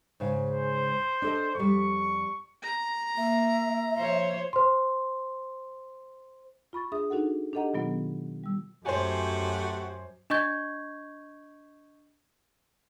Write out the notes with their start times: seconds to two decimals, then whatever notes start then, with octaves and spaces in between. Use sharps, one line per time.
0.20 G#2 C#3 F5
0.51 C5
1.22 D4 A4 D#5
1.55 F2 G3 C#6
2.62 A#5
3.17 A#3 E5
3.95 F3 C5 C#5
4.53 C5 C6
6.73 F4 B5 C#6 A6
6.92 D4 G#4 E5 D#6
7.10 D4 D#4 F#4 A4 F#5
7.53 D4 G4 A4 D#5 F#5 A#5
7.73 B2 D#3 F#3 B3 F4
8.44 G3 E6
8.86 F#2 A3 F#4 G4 C5 C#5 G#5
10.30 D4 D#5 C#6 G6 G#6